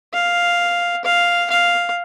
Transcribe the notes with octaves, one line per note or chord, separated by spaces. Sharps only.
F5
F5
F5